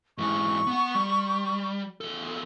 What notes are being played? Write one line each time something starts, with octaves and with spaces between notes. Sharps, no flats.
G#2 E3 C#6
B3 F#5
G3
E2 A4